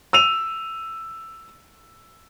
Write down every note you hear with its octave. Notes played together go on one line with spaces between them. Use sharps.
E6 D#7 F7